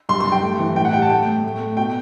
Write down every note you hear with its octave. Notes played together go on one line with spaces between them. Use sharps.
G2 C6
C6
G2
G5
A3
E3
A2 G5
F#5
G3 G5
A5
A3 G5
A2
A3
A3
B2 G5